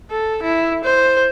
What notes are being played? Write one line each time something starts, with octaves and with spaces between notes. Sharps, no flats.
A4
E4
C5